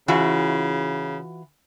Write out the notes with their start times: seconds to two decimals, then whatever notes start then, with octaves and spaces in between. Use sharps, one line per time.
0.08 C#3 E3 F4 F#4